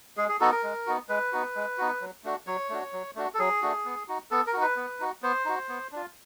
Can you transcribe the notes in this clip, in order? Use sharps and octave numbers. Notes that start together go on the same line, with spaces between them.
G#3 G#4
G#4
B3 D#4 F#4 A4
A#4
G#3
B3 D#4 F#4
G#3 B4
B3 D#4 F#4
G#3
B3 D#4 F#4
F#3
A3 D4 F#4
F#3 C#5
A3 D4 F#4
F#3
A3 D4 F#4
A4
F#3 G#4
A3 D4 F#4
B3
D#4 F#4
B3 A4
A#4
D#4 F#4
B4
B3
D#4 F#4
B3 C5
D#4 F#4
B3
D4 F4